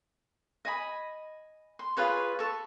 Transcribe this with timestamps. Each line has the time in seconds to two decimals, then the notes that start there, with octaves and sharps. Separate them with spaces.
0.65 D#5 G#5 B5
1.79 C6
1.97 F4 G#4 B4 C#5
2.39 A4 C#6